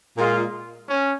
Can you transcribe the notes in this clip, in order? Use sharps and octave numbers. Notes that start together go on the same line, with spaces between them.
A#2 G#3 F4
C#4